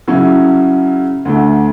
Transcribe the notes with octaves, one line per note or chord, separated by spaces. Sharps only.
C#3 F#3 C#4 E4
D2 D3 A3